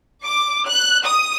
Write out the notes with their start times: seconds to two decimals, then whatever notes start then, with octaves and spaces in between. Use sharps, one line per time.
0.24 D6
0.66 F#6
1.04 D#6